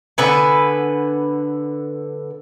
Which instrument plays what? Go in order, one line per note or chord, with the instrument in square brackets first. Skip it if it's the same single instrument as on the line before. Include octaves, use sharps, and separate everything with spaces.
[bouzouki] D3 B3 B4 G#5